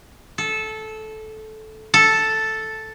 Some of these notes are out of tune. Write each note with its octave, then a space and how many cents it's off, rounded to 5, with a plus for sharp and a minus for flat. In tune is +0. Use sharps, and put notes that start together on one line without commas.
A4 -15
A4 +0